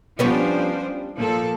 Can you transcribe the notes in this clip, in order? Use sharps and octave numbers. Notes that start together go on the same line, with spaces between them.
F3 G3 B3 C#4 D4 C5
A#2 F3 A4